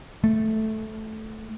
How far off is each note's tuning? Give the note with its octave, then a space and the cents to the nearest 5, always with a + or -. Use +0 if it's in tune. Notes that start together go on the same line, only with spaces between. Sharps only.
A3 -10